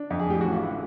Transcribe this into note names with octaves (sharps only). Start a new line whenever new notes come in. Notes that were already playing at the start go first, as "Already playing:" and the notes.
Already playing: D4
F2
G#4
A2 G4
A1 F#4
F4
A2 E4